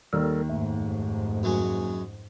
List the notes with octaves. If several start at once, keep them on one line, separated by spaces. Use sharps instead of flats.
D#2 D#3 G3 A4 A#4
F2 G#2 A3
F#2 F#3 G#3